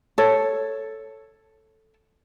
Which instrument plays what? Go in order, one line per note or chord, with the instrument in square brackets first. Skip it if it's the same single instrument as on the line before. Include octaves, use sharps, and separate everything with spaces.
[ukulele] A4 C#5